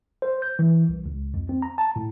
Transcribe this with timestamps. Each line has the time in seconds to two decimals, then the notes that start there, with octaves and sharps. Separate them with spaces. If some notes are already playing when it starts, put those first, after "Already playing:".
0.22 C5
0.42 G6
0.59 E3
0.89 C2
1.06 C#2
1.34 F2
1.49 C4
1.62 A#5
1.78 A5
1.96 A2